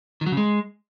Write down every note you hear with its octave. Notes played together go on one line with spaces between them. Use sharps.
D#3
F#3
C#3
G#3